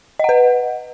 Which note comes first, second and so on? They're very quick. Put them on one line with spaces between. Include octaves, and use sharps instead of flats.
D#5 F#5 B4